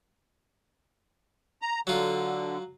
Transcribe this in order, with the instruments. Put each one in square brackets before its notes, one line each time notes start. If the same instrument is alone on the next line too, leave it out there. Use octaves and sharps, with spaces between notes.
[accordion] A#5
[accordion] D3 [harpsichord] F#3 F4